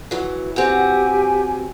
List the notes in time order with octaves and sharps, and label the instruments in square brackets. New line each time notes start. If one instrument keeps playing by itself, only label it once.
[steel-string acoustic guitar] E3 F#3
[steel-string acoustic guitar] C4 F#4 [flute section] G4 G#5